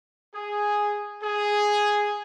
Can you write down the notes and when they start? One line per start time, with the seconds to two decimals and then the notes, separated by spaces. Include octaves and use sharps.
0.35 G#4
1.24 G#4